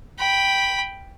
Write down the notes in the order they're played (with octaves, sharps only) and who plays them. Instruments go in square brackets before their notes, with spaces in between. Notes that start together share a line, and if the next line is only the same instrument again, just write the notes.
[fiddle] G5 B5